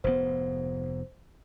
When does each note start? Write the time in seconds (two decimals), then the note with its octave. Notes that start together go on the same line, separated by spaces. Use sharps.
0.04 F1 G#2 B3 C5